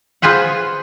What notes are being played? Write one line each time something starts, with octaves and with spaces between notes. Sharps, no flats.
F4 G#4 B4 C5 F#5